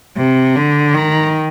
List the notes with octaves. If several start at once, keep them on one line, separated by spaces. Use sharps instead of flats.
C3
D3
D#3